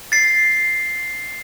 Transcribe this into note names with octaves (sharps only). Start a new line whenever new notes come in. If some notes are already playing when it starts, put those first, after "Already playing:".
A6 C7